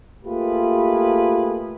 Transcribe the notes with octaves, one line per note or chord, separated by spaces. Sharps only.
A3 A#3 F4 G4 G#4 B4